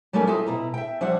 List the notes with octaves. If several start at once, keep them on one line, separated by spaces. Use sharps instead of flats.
F#3 G3 A3 A#3 C#4 D#4
E4 F4 G4 A4 D#5
B2 E4 A#5
E5 G5
F3 G3 D4 C#5 E5 F#5